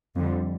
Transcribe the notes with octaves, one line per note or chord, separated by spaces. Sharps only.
F2 D3 G3